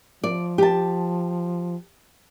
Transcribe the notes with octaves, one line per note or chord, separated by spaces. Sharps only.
F3 D5
G4 A5